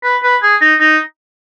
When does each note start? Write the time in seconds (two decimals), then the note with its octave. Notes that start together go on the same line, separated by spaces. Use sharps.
0.04 B4
0.23 B4
0.43 G#4
0.61 D#4
0.80 D#4